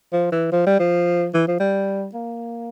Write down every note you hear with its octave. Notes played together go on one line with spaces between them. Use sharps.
F3
E3
F3
G3
F3
E3
F3
G3
A#3